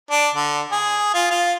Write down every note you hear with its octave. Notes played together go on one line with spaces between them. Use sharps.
D4
D3
G#4
F4
F4